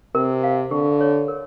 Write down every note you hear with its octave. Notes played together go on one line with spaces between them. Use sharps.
C3 A#4
F5
D3 G4
C#5
A#4